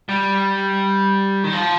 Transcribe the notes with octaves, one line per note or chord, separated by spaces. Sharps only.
G3
D#3
F3